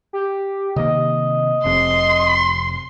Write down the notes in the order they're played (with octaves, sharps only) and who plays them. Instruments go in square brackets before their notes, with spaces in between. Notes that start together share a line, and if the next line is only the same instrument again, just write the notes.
[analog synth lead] G4
[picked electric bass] C3 D#3 A#3 [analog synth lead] D#5
[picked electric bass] F1 F2 C3 [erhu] C6